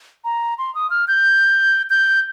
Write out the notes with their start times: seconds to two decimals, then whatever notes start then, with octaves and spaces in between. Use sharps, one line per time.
0.25 A#5
0.58 C6
0.75 D#6
0.90 F6
1.08 G6
1.90 G6